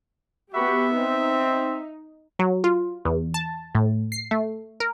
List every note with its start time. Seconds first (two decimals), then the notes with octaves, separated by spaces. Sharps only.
0.54 B3 F#4 G4 E5 B5 C#6
0.97 C4 D#4
2.39 F#3
2.64 F4
3.05 E2
3.34 A5
3.75 A2
4.12 C7
4.31 A3
4.80 A#4